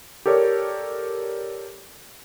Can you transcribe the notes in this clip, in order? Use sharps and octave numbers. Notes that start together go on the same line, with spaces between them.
G4 A4 A#4 C#5 D5